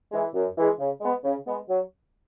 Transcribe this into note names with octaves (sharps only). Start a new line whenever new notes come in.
E3 G#3
F#2
E3 G#3
C#3
G#3 B3
C#3
G#3 B3
F#3